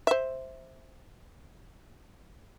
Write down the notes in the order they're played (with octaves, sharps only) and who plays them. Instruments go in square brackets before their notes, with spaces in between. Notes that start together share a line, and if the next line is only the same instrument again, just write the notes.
[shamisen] C5 E5